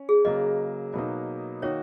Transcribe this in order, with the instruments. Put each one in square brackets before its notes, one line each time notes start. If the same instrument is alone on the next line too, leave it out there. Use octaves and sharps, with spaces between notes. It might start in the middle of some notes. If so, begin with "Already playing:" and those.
Already playing: [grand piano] C#4
[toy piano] G#4
[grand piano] C#3 F#3 A#3 [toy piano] D#5
[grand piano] B2 F#3 A#3 D#4
[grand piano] D#3 A#3 D#4 F#4 [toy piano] C#5